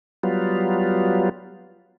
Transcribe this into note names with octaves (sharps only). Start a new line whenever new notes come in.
F#3 G3 B3 F4